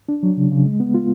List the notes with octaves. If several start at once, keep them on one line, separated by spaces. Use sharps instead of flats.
D4
F#3
C#3
C#3
G#3
B3
F4